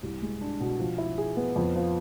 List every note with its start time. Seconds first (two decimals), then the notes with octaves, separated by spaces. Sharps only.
0.03 C2
0.22 G#3
0.41 D4
0.60 B2
0.79 F3
0.98 E4
1.18 G#4
1.37 B3
1.56 F2
1.76 F3